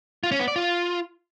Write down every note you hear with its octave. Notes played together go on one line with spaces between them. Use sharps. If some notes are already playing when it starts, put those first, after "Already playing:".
F4
C#4
B3
D5
F4